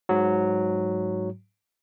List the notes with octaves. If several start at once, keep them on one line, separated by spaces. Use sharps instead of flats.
G#2 F#3